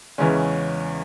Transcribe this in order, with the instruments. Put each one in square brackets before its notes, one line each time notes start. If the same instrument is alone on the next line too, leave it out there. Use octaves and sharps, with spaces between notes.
[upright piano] E2 C#3 E3 G#3 C#4